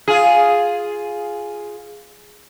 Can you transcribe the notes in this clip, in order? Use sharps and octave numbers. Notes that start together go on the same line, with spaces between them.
F4 G#4